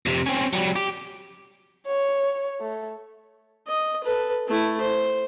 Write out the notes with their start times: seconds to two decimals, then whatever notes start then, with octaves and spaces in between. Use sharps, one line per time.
0.06 F2 C3
0.26 C4 C#4
0.53 F#3 G3
0.76 G4
1.87 C#5
2.61 A3
3.67 D#5
4.04 A4 B4
4.48 A3 E4
4.81 C5